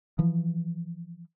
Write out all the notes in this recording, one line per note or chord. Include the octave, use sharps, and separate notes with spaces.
E3 F3